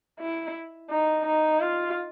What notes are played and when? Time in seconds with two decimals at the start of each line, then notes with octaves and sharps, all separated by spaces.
0.20 E4
0.90 D#4
1.26 D#4
1.61 F4